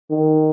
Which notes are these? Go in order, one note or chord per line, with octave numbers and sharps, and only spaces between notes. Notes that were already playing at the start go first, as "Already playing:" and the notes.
D#3